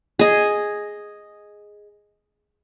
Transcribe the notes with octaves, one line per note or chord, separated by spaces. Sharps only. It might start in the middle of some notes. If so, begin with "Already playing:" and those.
G#4 D#5